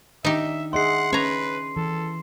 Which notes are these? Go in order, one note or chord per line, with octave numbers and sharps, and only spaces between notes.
D#3 D4 D#4 G4 E5
G#4 D#5 E5 F#5 C6 C7
C#4 B4 C#5 A#5
E3 A4